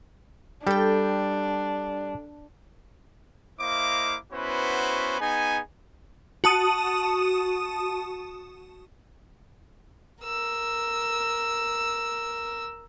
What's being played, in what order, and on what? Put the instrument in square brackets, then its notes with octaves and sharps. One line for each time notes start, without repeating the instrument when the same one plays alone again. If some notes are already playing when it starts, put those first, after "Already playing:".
[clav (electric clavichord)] G3 [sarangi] D4 [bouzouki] A4 G5
[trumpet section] A#3 E4 C5 D#5 F5 D6
B3 C#4 E4 F#4 B4 C5
B3 D#4 G#4 G#5
[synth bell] F#4 A5 D#6 D#7
[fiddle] A#4 E6